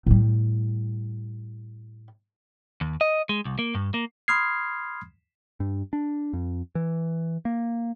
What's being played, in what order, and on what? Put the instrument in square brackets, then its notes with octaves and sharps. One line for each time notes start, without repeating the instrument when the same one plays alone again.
[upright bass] A2 G3
[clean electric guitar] D#2
D#5
G#3
C2
A#3
G2
A#3
[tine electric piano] B5 C6 D#6 F6 G#6 C7
[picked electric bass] G2
D4
F2
E3
A#3